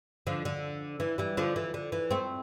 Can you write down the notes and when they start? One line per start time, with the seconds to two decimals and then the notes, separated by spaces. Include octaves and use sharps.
0.27 D3 F3
0.45 D3
1.00 E3
1.18 E3 G3
1.37 D3 F3
1.56 E3
1.74 D3
1.92 E3
2.11 A3 C4